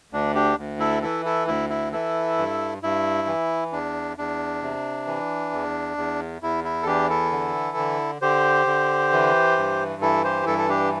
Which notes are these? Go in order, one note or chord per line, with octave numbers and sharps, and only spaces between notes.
D2 D4
D4 G4
D2
E4 A4
E3 E4 A4
E4 A4
D2 E4
E4
E3 E4 A4
G2
G2 E4
E3
E2 D4
E2 D4
C3
E3
E2
E2
E2 E4
E4
A4
E3 D4 G4
E4 A4
D3
D3
D3 G4 C5
D3
E3
G2
E3 E4 A4
G4 C5
G2 E4 A4
A4
D4 G4